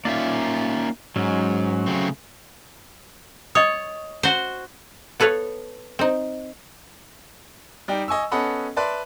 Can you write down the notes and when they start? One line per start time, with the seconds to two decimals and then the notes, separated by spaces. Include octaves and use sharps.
0.05 A#3 C#4 D#4 F4 D5 E5
1.16 G#2 F#3 C#4
1.86 C#3 A3 C4
3.55 C#5 D#5 C#6 D#6
4.23 F#4 C5
5.20 B3 A4 B4 C#5 F5
5.99 C4 D#4
7.88 G3 D#4 G5
8.08 D#5 G#5 C#6 E6
8.32 B3 C#4 A4 D#5 F#5 B5
8.77 B4 D5 E5 A5 C6